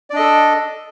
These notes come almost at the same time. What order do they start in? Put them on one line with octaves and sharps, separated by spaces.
D5 D4 D#5 A4